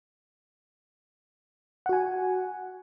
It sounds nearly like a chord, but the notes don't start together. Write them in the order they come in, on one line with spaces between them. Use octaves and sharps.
F#5 F#4 G#5